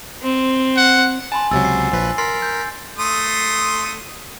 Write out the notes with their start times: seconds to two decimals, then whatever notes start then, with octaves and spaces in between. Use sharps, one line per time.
0.22 C4
0.77 F#5
1.32 G#5 A5 B5 C6
1.51 C#2 C3 F#3 E6 A6
1.65 C7
1.92 A#1 F3 B4
2.18 A#4 C6 A6 B6 C7
2.42 G6
2.98 A3 C6 D#6